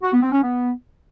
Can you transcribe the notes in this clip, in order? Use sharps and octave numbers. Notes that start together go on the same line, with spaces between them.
F#4
B3
C4
C#4
B3